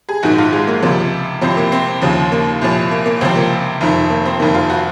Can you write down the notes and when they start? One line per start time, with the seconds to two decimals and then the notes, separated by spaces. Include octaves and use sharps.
0.09 G#4
0.23 A#1 G#2 D#3 F#4
0.38 F4
0.53 G#3
0.67 A#3
0.82 C#2 C3 F3 A#3
1.41 C2 C3 F3 C4
1.57 A#3
1.72 C4
2.02 D#2 C#3 F3
2.32 A#3
2.61 C2 A#2 F3
2.91 A#3
3.06 A#3
3.21 C#2 C3 F3 C4
3.35 A#3
3.81 F1 F2 D#3
4.10 A#3
4.25 C4
4.40 F1 F2 D#3 A#3
4.54 F4
4.70 F#4